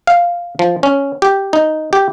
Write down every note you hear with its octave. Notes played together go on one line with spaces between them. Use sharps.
F5
F3
C#4
G4
D#4
G4